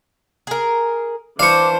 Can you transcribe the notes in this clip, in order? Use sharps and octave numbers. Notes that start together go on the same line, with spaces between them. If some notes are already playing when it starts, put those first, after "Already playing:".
G#4 A#4
E3 D4 C5 F5 C#6 D6